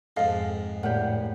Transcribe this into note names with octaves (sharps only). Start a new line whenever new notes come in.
F2 G#2 A4 D#5 F5
D2 A2 G4 A#4 F#5